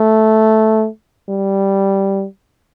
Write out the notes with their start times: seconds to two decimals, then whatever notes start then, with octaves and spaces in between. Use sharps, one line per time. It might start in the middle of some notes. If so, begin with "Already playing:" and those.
Already playing: A3
1.29 G3